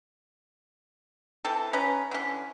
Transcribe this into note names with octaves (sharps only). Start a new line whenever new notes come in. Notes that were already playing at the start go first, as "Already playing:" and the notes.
E3 C4 A4 A5
C#4 B4 A#5
D3 E3 C#4